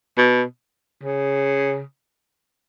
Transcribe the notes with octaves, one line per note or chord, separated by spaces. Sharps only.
B2
C#3